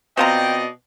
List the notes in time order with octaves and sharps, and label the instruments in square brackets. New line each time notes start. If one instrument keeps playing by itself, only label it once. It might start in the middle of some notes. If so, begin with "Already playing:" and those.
[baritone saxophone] B2 [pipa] C4 F4 A#5 [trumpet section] D5 D#5 [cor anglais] G5